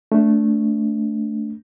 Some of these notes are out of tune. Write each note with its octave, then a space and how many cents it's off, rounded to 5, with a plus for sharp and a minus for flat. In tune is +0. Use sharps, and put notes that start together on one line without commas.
A3 +0 D4 -20